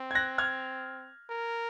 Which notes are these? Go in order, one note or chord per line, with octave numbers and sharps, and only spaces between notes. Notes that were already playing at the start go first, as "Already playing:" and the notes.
Already playing: C4
G#6
F#6 A#6
F6 G#6
A#4